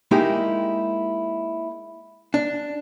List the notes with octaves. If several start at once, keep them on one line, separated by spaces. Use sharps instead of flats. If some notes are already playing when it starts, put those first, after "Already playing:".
G#3 A#3 D#4 E4 G4
D4